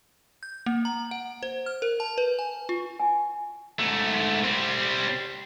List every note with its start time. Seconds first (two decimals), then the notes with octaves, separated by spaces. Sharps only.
0.43 G6
0.66 A#3
0.85 A#5
1.11 F#5
1.43 C5
1.66 F6
1.82 A#4
2.00 A5
2.18 B4
2.39 G#5
2.69 F4
3.00 G#5
3.79 G#2 A3
4.44 G3 C4